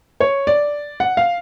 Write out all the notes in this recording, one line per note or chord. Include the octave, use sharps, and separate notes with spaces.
C#5
D5
F#5
F5